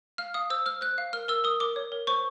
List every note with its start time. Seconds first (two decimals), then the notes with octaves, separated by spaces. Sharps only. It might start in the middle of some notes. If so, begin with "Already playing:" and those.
0.18 F5 F6
0.34 F5 D#6
0.50 C5 E6
0.66 C5 F6
0.81 C5 F#6
0.98 F5
1.13 A#4 F6
1.28 A#4 E6
1.44 A#4 D#6
1.60 A#4 D6
1.76 C#5
1.92 A#4
2.07 C5 C#6